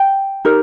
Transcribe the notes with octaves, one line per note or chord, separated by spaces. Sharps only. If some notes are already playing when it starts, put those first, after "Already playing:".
Already playing: G5
D#4 G4 A#4